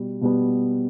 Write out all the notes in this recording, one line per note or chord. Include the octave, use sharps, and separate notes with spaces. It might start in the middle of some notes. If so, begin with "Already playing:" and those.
Already playing: B2 G3
B2 G3 B3